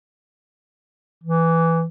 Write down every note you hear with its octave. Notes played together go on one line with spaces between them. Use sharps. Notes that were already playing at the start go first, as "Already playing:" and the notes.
E3